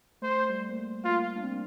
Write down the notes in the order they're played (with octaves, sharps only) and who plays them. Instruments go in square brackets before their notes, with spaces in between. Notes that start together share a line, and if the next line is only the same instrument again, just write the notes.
[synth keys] A3 [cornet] C5
[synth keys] G3
A#3
A3
[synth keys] A#3 [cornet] F4
[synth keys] D4
C4
A#3